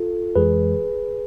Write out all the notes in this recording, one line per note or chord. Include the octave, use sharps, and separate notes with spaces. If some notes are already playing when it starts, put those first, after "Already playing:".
Already playing: F4 A4
F2 E3 G#3 G#4 B4